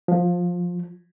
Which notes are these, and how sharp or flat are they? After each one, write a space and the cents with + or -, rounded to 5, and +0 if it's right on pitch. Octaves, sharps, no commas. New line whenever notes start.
F3 +15